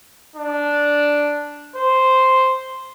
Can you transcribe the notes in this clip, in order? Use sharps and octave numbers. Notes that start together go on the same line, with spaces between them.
D4
C5